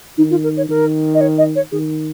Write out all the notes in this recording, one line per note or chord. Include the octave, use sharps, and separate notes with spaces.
D#3 D#4
F4
A#4
C#5
D#3 A#4
D#5
C#5
D#5
C#5
D#3 G#4